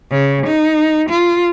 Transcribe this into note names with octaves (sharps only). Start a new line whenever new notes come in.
C#3
D#4
F4